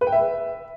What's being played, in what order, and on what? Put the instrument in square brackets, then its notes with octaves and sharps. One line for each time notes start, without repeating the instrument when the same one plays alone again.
[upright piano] B4
G5
E5